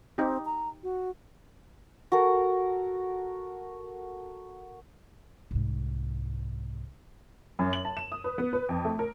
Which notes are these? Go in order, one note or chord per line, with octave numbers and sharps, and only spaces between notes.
C4 D#4 G4
A#5
F#4
F#4 A4 A#4
C2 G#2
F#2
F#7
A5
E7
D#6
B4
B3
B4
F2
A3
A#4